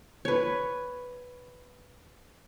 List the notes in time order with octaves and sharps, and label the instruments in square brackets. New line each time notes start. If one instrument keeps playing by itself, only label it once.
[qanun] B4 C#5